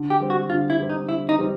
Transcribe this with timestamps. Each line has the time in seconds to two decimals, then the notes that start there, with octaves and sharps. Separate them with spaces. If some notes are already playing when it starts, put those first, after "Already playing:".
Already playing: D3
0.10 G4
0.20 G3 C4
0.30 F#4
0.50 D3 F4
0.70 E4
0.80 G3 C4
0.90 D#4
1.09 D3 E4
1.29 D#4
1.39 G3 C4